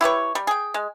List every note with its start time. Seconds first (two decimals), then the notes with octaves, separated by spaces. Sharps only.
0.01 E4 G4 B4 C#5
0.35 G3
0.47 G#4 G5
0.74 G#3